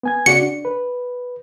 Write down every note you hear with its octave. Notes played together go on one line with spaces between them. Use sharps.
B3 G#5 G#6
C#3 F#4 D5 C#7
D4
B4